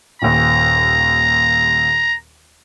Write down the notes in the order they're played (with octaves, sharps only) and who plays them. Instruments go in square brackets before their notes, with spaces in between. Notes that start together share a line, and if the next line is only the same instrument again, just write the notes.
[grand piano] D#1 D#2 [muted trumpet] A#5